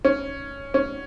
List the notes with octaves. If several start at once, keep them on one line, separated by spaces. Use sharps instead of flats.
C#4
C#4